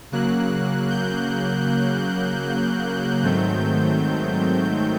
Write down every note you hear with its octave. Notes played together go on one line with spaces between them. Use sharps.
C#3 F#3 A#3 F#6
G6
G#2 D#3 F#3 A3 C4 G6